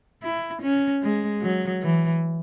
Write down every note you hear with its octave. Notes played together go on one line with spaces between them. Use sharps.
E4
C#4
G#3
F#3
E3